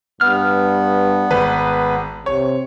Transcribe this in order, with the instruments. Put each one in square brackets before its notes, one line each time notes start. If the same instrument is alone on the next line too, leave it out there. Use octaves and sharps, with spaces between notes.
[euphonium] G2 [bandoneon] B3 [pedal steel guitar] F6
[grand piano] G#1 B4
[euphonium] C3 [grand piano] C#5